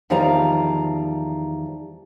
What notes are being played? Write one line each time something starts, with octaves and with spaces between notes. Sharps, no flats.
E2 D#3 F3 G3 F5 A#5